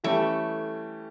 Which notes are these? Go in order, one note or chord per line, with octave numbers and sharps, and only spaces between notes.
E3 G3 A3 C#4 G4